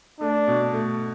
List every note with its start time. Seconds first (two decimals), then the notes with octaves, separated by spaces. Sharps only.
0.21 A3 D4
0.47 B2
0.73 A3